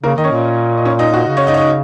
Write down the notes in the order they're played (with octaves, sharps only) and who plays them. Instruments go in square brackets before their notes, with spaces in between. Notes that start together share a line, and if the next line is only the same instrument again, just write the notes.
[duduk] C#3 [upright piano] A#3 A#4
[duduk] D#3 [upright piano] D#5
[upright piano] C#4 C#5
[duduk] A#2
[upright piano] D#5
C#4 C#5
D#4 D#5
F#4
[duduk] C#3
[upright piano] C#4 C#5
D#4 D#5
C#5
D#4 D#5